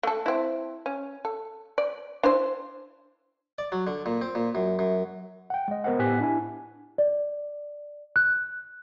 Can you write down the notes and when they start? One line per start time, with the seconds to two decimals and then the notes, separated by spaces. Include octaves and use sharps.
0.03 A3 A4
0.26 C4 E4
0.86 C#4
1.25 A4
1.78 D5
2.23 D4 E4 C5
3.58 D5
3.72 F#3
3.87 D3
4.06 A#2
4.22 C4
4.35 A#2
4.55 F#2
4.79 F#2
5.50 F#5 G5
5.68 G#3 D#5
5.84 B3 A#4 C5 D#5 F#5
5.99 A2 B3 G4 G#5 F#6 B6
6.20 D4 E4 G#5
6.98 D5
8.16 F#6